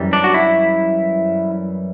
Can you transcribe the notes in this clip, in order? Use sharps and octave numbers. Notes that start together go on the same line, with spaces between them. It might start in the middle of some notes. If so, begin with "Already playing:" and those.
Already playing: F#2 E3 G3
D4
F#4
E4